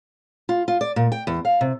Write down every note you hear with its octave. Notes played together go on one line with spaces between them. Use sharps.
F4
F4
D5
A#2
G5
E2
F5
C3